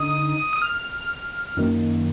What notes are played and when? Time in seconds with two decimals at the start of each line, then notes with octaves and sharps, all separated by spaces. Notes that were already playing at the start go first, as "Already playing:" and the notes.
Already playing: D3 D#4 D#6
0.53 D#6
0.62 F6
1.57 F#2 D#3 A#3